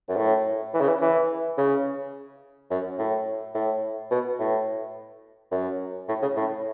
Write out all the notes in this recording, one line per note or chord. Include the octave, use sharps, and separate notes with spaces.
F#2
A2
E3
C#3
E3
E3
C#3
F#2
A2
A2
B2
A2
F#2
A2
C#3
A2